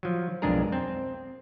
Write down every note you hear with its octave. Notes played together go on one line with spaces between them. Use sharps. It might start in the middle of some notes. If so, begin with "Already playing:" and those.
F3 F#3
B1 F2 G#3 D4 G#4 A#4
C4